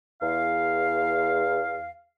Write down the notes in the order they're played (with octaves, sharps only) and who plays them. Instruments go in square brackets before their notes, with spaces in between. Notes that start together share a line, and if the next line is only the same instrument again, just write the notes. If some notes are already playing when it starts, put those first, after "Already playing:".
[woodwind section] E2 F5